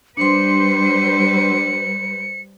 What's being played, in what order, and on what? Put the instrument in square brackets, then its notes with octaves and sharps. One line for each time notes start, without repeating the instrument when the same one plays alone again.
[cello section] G3 B4 C5 [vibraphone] D4 C6 [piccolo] C#7